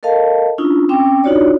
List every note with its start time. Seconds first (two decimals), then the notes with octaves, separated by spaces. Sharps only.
0.03 A4 A#4 D#5 F5 A5
0.58 C#4 D4 E4 F4 D#6
0.89 C4 C#4 G5 D6
1.24 D4 D#4 F4 F#4 C#5 D5